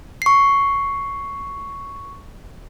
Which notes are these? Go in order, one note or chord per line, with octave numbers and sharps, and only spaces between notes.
C#6 C7